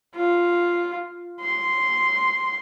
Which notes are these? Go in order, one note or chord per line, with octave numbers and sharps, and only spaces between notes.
F4
C6